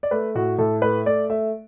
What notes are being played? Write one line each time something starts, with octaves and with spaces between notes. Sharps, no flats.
D5
A3 B4
A2 F#4
A2 A4
A3 B4
A3 D5
A3 E5